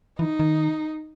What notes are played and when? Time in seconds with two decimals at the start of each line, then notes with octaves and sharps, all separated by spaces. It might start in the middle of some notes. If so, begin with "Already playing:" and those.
0.19 E3 D#4
0.39 D#3